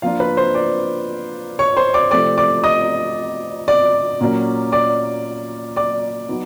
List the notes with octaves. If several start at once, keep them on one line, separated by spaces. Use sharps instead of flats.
F3 A#3 D4 F4 F5
B4 B5
C5 C6
D5 D6
C#5 C#6
C5 C6
D5 D6
C3 F3 A3 C4 D5 D6
D5 D6
D#5 D#6
D5 D6
A#2 F#3 A#3 C#4
D5 D6
D5 D6
F#3 B3 D#4